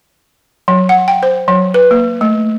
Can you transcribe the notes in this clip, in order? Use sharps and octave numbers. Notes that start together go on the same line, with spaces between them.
F#3
F#5
G5
C5
F#3
B4
A#3
A3